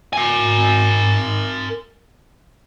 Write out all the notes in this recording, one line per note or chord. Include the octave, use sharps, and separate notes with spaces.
A#4 G#5